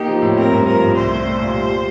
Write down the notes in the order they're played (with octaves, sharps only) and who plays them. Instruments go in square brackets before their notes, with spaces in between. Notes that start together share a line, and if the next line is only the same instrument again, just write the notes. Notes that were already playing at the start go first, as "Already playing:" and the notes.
Already playing: [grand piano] A#3 D#4 [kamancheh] G4
[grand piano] F3
A2
[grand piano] C4 [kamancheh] A#4
[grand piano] G2
[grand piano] F3 [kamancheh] A#4
[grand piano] G2
[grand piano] C2 [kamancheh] C5
[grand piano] A3
A3
A#2
G3
G3